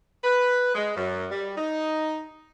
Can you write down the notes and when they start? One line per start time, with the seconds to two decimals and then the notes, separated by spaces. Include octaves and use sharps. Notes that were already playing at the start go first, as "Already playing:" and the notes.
0.24 B4
0.75 G#3
0.96 F#2
1.31 G3
1.58 D#4